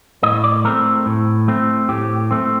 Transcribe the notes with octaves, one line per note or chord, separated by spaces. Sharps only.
A2 D#5
D5
A3 C4 A#4
A2
A3 C4
A2 G4
A3 C4